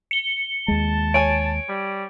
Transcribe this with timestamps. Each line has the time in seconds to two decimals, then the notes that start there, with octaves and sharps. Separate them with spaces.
0.11 C#7 G7
0.68 D#2 G#3 A5
1.14 C#5 G#5 D7
1.69 G3